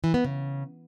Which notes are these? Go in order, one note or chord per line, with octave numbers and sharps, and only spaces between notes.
E3
B3
C#3